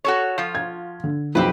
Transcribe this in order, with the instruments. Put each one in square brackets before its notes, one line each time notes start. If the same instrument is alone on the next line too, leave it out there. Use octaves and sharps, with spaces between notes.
[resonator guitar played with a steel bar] F#4 A4 C#5
F3 F4
[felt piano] G#6
D3
[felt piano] B1 F2 [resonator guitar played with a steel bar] C4 G4 B4